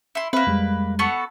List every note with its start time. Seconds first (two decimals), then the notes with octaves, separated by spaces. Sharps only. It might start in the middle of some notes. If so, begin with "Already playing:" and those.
0.15 E4 C6
0.33 A#3 C4 B4 E5
0.47 F2 G3 G#3
0.99 B3 F#4 A4